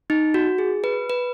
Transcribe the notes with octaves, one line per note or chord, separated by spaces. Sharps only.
D#4
F#4
G#4
B4
B4